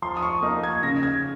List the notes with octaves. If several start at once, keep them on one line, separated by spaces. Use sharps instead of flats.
F3 C6
D#6
C#6
A#3 D#4 D#6
G#6
C#3 A#6
G#6